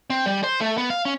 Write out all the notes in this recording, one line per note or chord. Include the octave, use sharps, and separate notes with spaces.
C4
G3
C5
A3
B3
F5
C#4